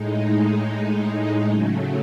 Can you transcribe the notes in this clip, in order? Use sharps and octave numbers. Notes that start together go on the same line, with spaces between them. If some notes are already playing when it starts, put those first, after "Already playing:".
Already playing: A2 G#3 D#4
C#3 F#3 A3